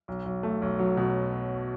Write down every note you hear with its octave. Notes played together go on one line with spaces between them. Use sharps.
B1
B1
A3
B1
F#3
B2